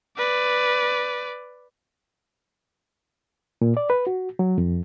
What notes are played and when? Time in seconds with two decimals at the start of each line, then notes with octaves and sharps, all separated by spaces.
0.18 B4 D5
3.61 A#2
3.77 D5
3.90 B4
4.07 F#4
4.39 F#3
4.58 F2